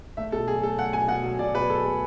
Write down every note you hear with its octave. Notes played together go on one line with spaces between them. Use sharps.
A3 E5
B2 A4
F#3 G#4
A3 A4
A3 F#5
B2 G#5
B2 F#5
F#3
B2 D5
B2 B4
F#3 A4
A3 A4